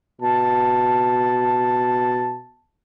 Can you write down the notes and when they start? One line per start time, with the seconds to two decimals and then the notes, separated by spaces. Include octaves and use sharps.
0.21 B2 A5